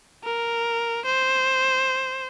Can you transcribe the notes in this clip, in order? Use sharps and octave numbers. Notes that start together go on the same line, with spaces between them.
A#4
C5